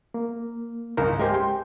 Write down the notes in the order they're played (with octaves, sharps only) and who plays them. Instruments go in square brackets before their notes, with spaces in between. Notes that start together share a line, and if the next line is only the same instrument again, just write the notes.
[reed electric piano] A#3
[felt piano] G#1 C#2 F#2 [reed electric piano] A#4
[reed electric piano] G#3 G4 G#5 [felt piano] A#4 C5
[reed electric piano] G5 [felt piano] C6